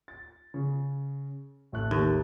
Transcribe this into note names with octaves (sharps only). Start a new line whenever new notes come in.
A6
C#3
A1 A3 F#6
D#2